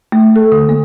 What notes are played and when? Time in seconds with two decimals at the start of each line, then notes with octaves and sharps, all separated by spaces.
0.12 A3
0.36 A4
0.52 D3
0.69 A#3